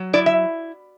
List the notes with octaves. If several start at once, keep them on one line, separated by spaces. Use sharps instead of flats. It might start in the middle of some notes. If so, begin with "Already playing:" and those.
Already playing: F#3
E4 D5
E5